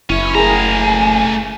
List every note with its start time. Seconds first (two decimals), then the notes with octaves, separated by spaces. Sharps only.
0.10 F#1 C#4 E4
0.35 A3 G#4 A#4 G#5 A#5